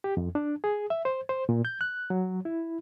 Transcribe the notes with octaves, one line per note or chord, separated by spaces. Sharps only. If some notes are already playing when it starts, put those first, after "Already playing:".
G4
F2
D4
G#4
E5
C5
C5
A#2
G6
F#6
F#3
E4